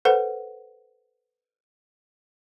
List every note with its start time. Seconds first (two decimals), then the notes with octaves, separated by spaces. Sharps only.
0.05 A4 B4 C5 F#5